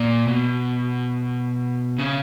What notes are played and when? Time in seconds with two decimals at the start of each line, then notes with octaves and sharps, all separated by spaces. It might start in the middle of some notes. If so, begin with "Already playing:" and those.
Already playing: A#2
0.27 B2
1.98 C#3